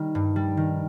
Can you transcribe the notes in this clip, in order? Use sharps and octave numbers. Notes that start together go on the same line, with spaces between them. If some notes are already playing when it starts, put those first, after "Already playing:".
Already playing: D#3 G3
G2
G3
D#3